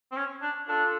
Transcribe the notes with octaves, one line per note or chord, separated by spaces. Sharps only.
C4
C#4
D4
D4 F4 A4